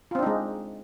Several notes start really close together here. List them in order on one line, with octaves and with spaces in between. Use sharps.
F4 C4 D4 D#4 G#3